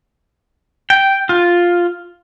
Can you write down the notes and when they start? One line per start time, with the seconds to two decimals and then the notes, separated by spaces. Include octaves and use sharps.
0.90 G5
1.29 F4